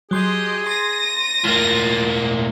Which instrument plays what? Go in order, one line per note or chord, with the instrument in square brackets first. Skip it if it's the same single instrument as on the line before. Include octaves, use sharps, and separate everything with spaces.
[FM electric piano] F#3 C6 G6 [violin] G4 D#5 [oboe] G#4
[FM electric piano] C6 A6 [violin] A#6 D#7
[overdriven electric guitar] A2 A#3 [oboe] F4